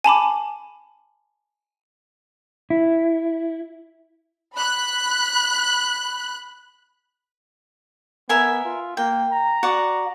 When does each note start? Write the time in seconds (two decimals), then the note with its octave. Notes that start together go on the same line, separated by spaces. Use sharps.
0.04 G#5 A5 B5 D6
2.70 E4
4.55 B5 F#6
8.29 B3 A#4 E5 G#5
8.65 F4
8.97 A#3 G5
9.31 A#5
9.63 F#4 D5 F#5